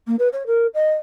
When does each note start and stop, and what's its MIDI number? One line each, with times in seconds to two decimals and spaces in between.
0.07 0.15 58
0.19 0.28 71
0.32 0.43 73
0.46 0.66 70
0.74 0.92 75